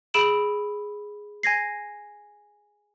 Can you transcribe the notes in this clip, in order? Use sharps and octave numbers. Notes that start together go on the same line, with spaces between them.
G#4 B5 E6 D7 E7 F#7
G#5 G#6 A#6 C7